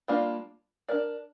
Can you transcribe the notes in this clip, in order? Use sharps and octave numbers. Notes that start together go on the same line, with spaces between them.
G3 A#3 D4 F4
D4 A#4 D5